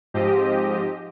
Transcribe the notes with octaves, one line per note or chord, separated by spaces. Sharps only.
G#2 F3 C4 G4 D#5